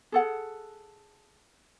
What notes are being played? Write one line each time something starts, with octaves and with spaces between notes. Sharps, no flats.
G#4 A4 F#5